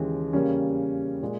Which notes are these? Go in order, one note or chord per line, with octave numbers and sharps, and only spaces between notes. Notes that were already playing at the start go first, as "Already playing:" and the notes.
Already playing: D#2 C#3 E3 G#3
E2 C#3 G3 A#3 C#4
A#2 G#3